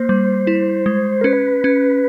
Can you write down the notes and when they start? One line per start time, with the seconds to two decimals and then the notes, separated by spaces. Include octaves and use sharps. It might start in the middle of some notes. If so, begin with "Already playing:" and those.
Already playing: A#3 C5
0.09 G3
0.47 E4
0.86 G#3
1.21 A#4
1.24 C#4 B4
1.64 C#4